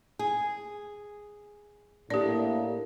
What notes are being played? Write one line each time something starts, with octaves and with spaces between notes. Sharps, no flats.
G#4
A2 A#3 D4 G4 D5